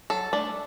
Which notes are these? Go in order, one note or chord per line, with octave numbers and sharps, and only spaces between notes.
F#3 A4
A3 D4